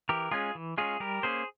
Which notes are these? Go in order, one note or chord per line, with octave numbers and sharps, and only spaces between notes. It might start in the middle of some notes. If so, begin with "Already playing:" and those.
E3 G4 A#4
G#3 C#4 F4 G#4
E3
G#3 C#4 F4 G#4
G3 G4 A#4
A#3 C#4 G#4 C5